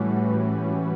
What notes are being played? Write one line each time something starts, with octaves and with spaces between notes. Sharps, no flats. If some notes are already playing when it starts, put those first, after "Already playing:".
Already playing: A2 E3 G3 C#4 F#4 B4